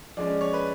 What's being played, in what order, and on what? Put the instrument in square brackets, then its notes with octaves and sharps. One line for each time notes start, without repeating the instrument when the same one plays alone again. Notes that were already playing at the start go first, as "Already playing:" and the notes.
[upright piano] F3 G#3 C#4 D5
C#5
B4